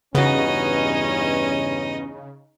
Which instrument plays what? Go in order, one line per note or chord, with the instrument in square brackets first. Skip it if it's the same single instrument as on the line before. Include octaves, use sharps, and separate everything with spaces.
[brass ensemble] E2 G2 C#4 [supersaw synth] C#3 [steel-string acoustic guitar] B3 F#4 [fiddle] D#4 D#5